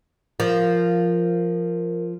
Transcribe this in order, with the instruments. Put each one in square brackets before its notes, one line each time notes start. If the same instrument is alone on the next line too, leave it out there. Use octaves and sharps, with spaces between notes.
[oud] F3 [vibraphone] A#4